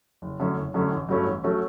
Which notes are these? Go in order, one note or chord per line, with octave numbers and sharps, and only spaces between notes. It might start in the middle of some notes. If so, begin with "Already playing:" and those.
F#1
F#2 D3 A3 C#4
F#1
F#2 D3 A3 C#4
A1
G2 F#3 A3 C#4
A1
F#3 A3 C#4